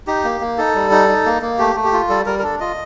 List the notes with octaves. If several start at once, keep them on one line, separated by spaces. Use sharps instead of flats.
D#4 G4
A#3
A#3
D#4 A4
G3
D#4
D#4
A#3
A#3
A3 G4
A3
G4
F4
G3 A4
G3 A#4
A#4
D4 A4
F4 D#5